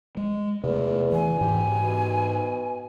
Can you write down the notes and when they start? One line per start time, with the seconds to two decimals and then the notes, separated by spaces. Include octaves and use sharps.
0.17 G#3
0.64 E2 C3 A3
1.12 E3 G#5
1.41 G#2 E3 G4
1.83 B2